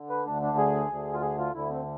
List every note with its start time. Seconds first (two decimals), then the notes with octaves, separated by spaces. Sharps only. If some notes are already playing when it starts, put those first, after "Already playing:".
Already playing: D3
0.10 B4
0.25 D2 D3 D4
0.42 D4
0.57 G#4
0.90 D2 D3
1.13 F4
1.22 G#4
1.38 F4
1.54 D2 D3 E4
1.70 C4